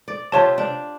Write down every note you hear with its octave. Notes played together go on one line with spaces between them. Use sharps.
D5
C3 F4 G4 C#5 A5
D4